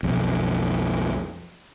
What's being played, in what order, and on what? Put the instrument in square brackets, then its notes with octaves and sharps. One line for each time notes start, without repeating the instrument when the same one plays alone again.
[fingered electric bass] B1 F2